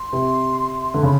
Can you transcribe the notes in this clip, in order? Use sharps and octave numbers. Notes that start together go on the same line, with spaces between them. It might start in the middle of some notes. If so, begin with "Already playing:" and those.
Already playing: C6
C3
D3
C#3 B5